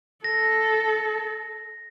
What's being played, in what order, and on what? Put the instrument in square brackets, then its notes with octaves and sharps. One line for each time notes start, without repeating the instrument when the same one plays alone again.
[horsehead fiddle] A4 [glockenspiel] A#6